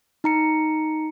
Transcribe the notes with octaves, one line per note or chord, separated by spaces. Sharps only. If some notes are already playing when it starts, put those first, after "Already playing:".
D#4 A#5 C#7